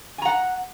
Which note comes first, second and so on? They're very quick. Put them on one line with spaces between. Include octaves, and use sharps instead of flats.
G#5 A#5 F#5